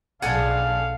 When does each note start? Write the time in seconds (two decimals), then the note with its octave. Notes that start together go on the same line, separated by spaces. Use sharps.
0.22 B1 D4 G#4 A4 F5 F#5 G#5